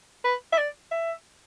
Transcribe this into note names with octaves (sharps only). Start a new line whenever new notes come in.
B4
E5
D5
E5